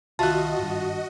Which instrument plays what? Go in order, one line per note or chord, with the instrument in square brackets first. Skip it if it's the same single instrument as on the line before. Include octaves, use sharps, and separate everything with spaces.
[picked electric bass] C2 D#3 [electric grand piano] F4 E5 F#6 [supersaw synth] F#4 D#5 [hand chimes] A5
[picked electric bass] G#1 G2